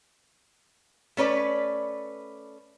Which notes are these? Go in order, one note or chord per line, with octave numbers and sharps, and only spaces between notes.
A3 C#4 B4 D5